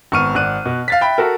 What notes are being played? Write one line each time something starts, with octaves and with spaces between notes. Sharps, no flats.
G#1 B3 C#6 F6 D#7
G#1 D5 F#6 D#7
B2
F5 A6 B6
E5 G5 B5
F#4 A4 A#4